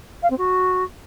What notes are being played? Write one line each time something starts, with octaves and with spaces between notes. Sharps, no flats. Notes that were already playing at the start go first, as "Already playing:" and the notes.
F5
C4
F#4